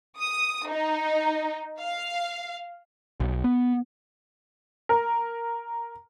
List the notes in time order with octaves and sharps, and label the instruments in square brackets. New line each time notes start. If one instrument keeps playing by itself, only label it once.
[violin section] D#6
D#4
F5
[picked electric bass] B1
B3
[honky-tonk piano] A#4